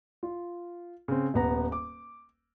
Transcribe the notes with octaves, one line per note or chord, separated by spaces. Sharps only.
F4
C#3 C4
D#1 B3 A#5
D6